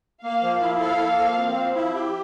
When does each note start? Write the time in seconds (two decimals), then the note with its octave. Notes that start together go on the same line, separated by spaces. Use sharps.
0.23 A#3 F5
0.43 F3
0.62 E4
0.80 A4 F5
1.00 A#3
1.19 F3
1.37 C4
1.56 F3
1.75 E4
1.95 G4